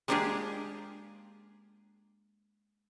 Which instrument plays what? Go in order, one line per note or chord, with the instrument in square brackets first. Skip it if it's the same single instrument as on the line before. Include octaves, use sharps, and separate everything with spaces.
[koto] G#3 A#3 D4 F4 G4 G#4